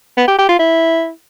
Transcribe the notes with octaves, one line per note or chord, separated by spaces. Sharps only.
B3
G4
G4
F4
E4